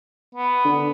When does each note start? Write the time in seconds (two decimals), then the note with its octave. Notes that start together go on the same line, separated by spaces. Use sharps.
0.35 B3
0.65 D3